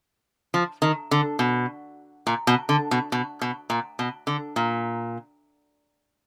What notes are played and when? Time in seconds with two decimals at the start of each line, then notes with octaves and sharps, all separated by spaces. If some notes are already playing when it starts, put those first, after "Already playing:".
0.54 F3
0.82 D#3
1.11 D3
1.39 B2
2.27 A#2
2.47 B2
2.69 D3
2.91 B2
3.12 B2
3.41 B2
3.70 A#2
3.99 B2
4.27 D3
4.56 A#2